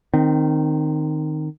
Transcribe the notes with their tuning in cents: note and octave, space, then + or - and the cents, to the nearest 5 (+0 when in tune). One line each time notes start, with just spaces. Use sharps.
D#3 -15 C4 +0